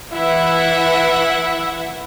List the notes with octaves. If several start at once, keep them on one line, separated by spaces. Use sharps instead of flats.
E3 E4 E5 F#5